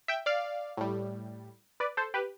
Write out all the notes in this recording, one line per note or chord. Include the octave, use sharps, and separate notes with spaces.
E5 G5
D5 F5
A2 G3
B4 D5
A4 C5
G4 B4